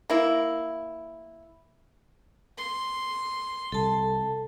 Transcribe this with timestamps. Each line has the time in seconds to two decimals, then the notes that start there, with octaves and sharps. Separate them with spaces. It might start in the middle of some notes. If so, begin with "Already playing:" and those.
0.10 A#3 E4
2.58 C6
3.72 C2 A4 A5